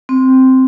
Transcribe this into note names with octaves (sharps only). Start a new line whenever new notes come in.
C4